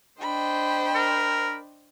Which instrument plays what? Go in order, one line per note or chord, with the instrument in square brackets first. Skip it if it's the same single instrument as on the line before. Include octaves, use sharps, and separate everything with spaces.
[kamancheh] D4 B5 [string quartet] C5 D#5 G5
[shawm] A#4